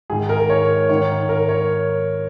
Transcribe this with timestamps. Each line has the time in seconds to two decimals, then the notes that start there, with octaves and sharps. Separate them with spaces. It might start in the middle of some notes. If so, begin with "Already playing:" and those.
0.10 G#2 D#3 G#4
0.29 A#4
0.50 C#5
0.89 G#2 D#3 C#5
1.29 A#4
1.49 C#5